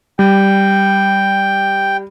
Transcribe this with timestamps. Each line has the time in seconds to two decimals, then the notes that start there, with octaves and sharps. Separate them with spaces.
0.19 G3 G5